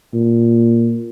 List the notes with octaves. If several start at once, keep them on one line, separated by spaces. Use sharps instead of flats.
A#2